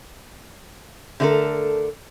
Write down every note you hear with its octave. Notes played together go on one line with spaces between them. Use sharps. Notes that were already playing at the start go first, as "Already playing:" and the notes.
D3 A3 C4 D#4 A4 A#4